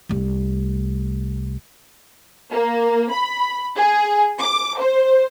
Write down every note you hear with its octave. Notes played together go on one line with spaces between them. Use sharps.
C2 A3
A#3
B5
G#4
D6
C5